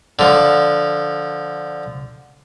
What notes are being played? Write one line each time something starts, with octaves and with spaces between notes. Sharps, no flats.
D3 F3